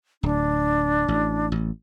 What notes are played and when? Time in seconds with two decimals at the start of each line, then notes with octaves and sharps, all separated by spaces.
0.23 D1 D4
1.08 A1
1.52 A1